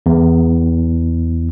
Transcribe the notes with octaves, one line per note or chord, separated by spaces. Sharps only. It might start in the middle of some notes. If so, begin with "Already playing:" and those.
E2